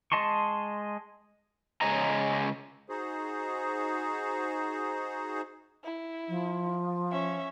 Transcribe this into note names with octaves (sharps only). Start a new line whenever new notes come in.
G#3 D#5 A5 C6 C#6
C#3 G#3 C#5 D#5 A#5
D#4 F#4 G#4 C5
E4
F3
C#4 E5